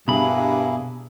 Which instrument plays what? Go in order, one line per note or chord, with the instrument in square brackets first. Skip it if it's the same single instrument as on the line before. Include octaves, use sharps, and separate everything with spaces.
[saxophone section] G2 [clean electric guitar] B2 B5 [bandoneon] A#3 E4 G#4